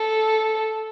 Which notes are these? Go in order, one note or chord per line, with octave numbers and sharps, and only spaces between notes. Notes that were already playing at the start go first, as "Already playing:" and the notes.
Already playing: A4